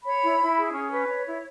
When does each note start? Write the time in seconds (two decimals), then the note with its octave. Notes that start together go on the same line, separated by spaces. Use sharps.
0.04 C#5 B5
0.22 E4
0.39 E4
0.57 G#4
0.73 C#4
0.91 B4
1.08 C#5
1.25 E4